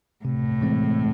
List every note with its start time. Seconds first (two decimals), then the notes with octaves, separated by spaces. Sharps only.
0.25 A2 C3
0.61 E3 G#3 C4